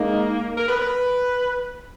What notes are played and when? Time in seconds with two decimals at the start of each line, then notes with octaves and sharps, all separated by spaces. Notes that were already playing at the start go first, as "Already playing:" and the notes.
Already playing: G#3 A#3 D#4
0.58 A#4
0.69 B4
0.80 B4